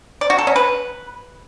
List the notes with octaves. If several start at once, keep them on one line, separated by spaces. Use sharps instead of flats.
D5
F#4
A4
C#4
B4